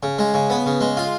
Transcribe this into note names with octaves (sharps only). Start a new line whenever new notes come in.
C#3
G#3
C#3
B3
C#3
G#3
F4